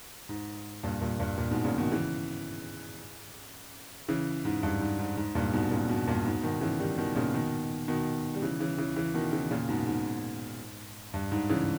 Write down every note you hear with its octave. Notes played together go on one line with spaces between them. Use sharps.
G#2
G2 A#2
G2 A#2
G2 A#2
G2 A#2
G#2 B2
A#2 C#3
B2 D#3
C#3 E3
C#3 E3
G#2
G2
G#2
G#2
G#2
G2 A#2
G#2 B2
A#2 C#3
G#2 B2
G2 A#2
G#2 B2
B2 D#3
C#3 E3
D#3 G3
B2 D#3
A#2 C#3
B2 D#3
B2 D#3
G3
C#3 E3
C#3 E3
C#3 E3
C#3 E3
B2 D#3
C#3 E3
A#2 C#3
G#2 B2
G#2
G2
G#2
C#3 E3